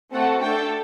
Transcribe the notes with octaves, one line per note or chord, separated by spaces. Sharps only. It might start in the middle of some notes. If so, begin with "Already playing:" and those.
A3 C4 F#4 A4 F#5
A3 D4 A4 G5